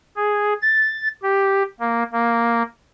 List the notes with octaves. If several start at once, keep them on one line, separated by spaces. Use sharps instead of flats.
G#4
A6
G4
A#3
A#3